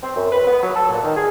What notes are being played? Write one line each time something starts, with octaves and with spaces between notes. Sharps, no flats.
C4
F#2
B4
B3
F#3
A4
A#2
D#3
G#4